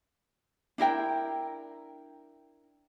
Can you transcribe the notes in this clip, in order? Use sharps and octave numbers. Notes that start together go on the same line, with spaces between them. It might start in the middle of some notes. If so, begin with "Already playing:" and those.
D4 E4 A#4 G5